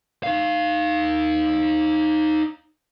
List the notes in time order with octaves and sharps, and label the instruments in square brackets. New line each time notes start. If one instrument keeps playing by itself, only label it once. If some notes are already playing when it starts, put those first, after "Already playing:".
[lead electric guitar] D#4 F5